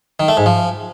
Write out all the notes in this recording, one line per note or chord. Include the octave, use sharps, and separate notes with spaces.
D#3
A3
G#2
F3